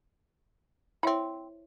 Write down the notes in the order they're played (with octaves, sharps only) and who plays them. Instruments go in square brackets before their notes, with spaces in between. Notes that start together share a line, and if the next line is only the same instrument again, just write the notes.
[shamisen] C4 B5 [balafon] E4 C#5 E5